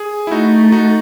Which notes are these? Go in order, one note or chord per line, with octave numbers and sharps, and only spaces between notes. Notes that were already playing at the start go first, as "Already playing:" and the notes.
Already playing: G#4
E4
A3 D#4 F#4
D#4 F#4